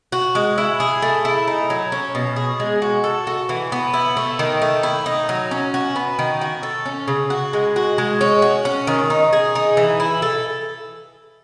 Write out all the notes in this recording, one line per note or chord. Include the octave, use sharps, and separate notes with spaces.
F#4
G#3
E4
G#4
A3
E4
D#4
F#3
C#4
B2
G#4
G#3
F#4
A4
F#4
E3
B3
E4
A3
D#3
A3
E4
D#4
F#3
C#4
F#4
B3
D#3
F#4
A4
C#4
C#3
F#4
G#3
F#4
G#3
C#4
F#4
C#4
D#3
D#4
G#4
D#4
E3
E4
A4